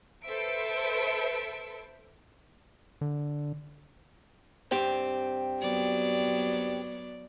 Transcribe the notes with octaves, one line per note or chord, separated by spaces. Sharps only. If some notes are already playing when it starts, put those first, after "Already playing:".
A4 B4 C5 E5 D7
D3
G2 C4 G4
F#3 B3 D5